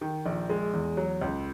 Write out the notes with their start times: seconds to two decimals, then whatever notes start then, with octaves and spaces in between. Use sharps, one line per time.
0.01 D#3
0.26 A#1
0.50 G#3
0.73 E2
0.97 F#3
1.21 C#2